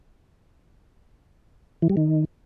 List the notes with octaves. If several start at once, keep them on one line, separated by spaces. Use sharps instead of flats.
E3
G3
D#3